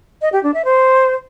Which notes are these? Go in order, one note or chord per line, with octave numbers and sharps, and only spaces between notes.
D#5
G4
D4
E5
C5